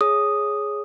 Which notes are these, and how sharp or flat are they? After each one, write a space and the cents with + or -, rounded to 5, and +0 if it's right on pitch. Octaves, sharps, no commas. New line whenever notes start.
G#4 +0 C#5 +0 D#6 -5